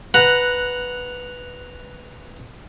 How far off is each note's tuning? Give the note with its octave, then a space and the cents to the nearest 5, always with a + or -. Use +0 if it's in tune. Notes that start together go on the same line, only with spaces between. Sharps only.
B4 +0 F#5 -5 A#5 +0